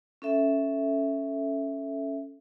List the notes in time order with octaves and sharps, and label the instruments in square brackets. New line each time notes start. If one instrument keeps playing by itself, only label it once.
[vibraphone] C#4 A4 E5